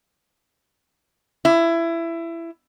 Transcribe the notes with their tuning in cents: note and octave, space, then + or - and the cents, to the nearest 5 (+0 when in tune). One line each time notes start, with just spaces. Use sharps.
E4 +20